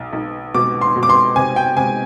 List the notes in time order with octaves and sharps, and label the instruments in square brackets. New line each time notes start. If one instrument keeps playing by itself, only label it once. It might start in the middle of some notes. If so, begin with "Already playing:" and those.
Already playing: [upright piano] B1
B1
B2 D6
C6
B2
D6
C6
C3 G#5
G5
C3 G#5